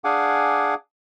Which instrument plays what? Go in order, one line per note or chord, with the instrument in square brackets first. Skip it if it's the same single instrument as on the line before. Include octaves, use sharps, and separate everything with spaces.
[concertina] D4 G#4 F5 F#5 G#5 D6